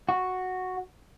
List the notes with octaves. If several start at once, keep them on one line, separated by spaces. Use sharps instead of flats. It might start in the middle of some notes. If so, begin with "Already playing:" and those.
F#4